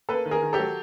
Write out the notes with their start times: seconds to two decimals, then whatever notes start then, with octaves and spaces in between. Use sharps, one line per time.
0.09 A#3 A4 B4
0.26 D#3
0.31 G#4 A#4
0.42 D#3
0.53 G4 A4
0.60 F#3